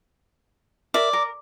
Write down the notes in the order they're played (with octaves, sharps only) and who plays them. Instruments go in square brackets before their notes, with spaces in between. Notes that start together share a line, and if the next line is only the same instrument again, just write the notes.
[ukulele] A#4 E5 [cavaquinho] D5
[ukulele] A#4